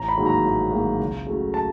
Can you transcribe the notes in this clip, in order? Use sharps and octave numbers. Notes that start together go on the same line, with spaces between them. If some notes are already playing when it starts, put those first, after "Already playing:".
Already playing: A1 A#5
B5
G#2 D#3 F#3 A#3
A#5
A1
G#2 D#3 F#3 A#3
C#2
C#3 F#3 A3
A5